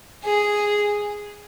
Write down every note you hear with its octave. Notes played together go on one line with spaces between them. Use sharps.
G#4